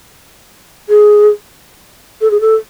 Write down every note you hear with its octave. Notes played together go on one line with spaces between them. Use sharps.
G#4
A4
G#4
A4